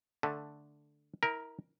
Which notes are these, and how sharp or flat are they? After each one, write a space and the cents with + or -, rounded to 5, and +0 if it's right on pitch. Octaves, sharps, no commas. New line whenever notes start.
D3 +0 A3 +0
E4 -35 A#4 +0